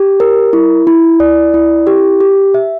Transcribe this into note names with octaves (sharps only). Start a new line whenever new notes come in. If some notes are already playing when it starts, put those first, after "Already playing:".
Already playing: G4
A#4
E4
E4
D5
E4
G4
G4
E5